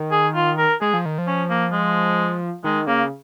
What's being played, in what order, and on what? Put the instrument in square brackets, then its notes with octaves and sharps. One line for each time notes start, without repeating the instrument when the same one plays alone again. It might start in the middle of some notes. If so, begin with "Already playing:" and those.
Already playing: [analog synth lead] D#3
[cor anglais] G#4
F4
A#4
[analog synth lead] G#3 [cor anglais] G#4
[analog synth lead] F3
D#3
F3
[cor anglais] C#4
A#3
G#3
[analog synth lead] D#3 [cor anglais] G#3
[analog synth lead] C#3 [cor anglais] A#3